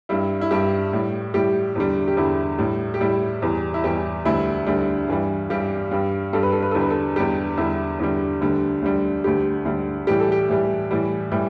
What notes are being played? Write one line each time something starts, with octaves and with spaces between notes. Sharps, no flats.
G2 G3 E4
E4
G2 G3 G4
A2 G3
A2 G3 G4
E2 D3 G3
G4
E2 D3 G3 E4
A2 G3
G4
A2 G3 E4
E2 E3 G3
E4
E2 E3 G3 G4
D2 D3 G3 E4
D2 D3 G3
G2 E3 G3
G2 E3 G3 G4
G2 G3
G2 G3 A4
B4
A4
B4
E2 D3 G3 A4
B4
A4
E2 D3 G3 G4
E2 D3 G3 E4
E2 D3 G3
D2 D3 G3
D2 D3 G3
D2 D3 G3 G4
D2 D3 G3
A2 E3 G3 G4
A4
G4
A2 E3 G3
A2 E3 G3
A2 E3 G3